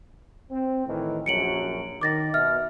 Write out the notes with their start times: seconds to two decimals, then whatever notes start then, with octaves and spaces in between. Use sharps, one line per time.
0.51 C4
0.86 A2 D#3 E3
1.26 A#1 F#2 F#3 C#7 D7 F#7
2.01 D#3 D6 A6 A#6
2.34 B2 E5 F6